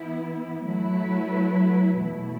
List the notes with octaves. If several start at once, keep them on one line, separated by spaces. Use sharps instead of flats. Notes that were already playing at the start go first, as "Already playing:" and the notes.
Already playing: E3 B3 E4
F#3 A3 E4 B4
E2 B2 A3 E4